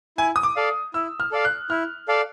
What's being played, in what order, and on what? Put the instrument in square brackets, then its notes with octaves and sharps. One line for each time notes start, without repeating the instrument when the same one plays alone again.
[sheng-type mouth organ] E4 [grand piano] G#5
[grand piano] D#6
D6
[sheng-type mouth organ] A4 D5 F5
[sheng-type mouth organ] E4 [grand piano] E6
[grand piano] F6
[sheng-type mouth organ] A4 D5 F5
[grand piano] F#6
[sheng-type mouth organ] E4 [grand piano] F6
[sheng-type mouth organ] A4 D5 F5